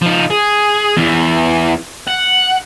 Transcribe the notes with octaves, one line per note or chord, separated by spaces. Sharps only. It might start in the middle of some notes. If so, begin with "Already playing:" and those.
F3 D#4
G#4
E2 E3
F#5